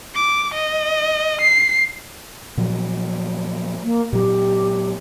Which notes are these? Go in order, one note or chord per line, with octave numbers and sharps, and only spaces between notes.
D6
D#5
C7
A#2 F3 F#3
A#3
A#2 F#3 G4